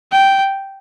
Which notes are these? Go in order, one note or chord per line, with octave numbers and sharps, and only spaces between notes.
G5